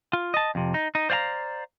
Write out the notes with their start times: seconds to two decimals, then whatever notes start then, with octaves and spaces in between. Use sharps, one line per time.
0.13 F4
0.34 D#5 A5
0.55 F2 C3
0.74 D#4
0.95 D#4
1.10 C5 D5 F5 G5 A#5